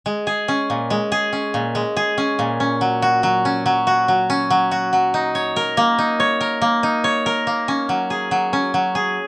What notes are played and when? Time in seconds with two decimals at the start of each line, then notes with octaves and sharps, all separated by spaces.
0.06 G#3
0.27 G#4
0.48 C#4
0.70 A#2
0.90 G#3
1.12 G#4
1.33 C#4
1.54 A#2
1.75 G#3
1.97 G#4
2.18 C#4
2.39 A#2
2.60 C#4
2.81 F#3
3.02 F#4
3.23 F#3
3.45 C#4
3.66 F#3
3.87 F#4
4.08 F#3
4.30 C#4
4.50 F#3
4.71 F#4
4.93 F#3
5.14 D#4
5.35 C#5
5.56 A#4
5.77 A#3
5.98 D#4
6.20 C#5
6.41 A#4
6.62 A#3
6.83 D#4
7.04 C#5
7.26 A#4
7.47 A#3
7.68 C#4
7.89 F#3
8.10 G#4
8.31 F#3
8.53 C#4
8.74 F#3
8.95 G#4